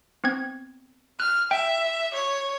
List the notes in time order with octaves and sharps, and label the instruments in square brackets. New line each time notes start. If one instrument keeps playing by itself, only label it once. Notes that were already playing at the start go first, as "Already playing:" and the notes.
[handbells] B3 C4 G#6
[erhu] F6 [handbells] F#6
[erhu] E5 [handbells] G5
[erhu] C#5